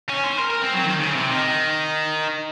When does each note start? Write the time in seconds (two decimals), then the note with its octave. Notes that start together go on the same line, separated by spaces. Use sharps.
0.09 C#4
0.24 C5
0.39 A#4
0.50 A#4
0.62 C4
0.73 F#3
0.84 D#3
1.00 C#3
1.15 C3
1.30 D#3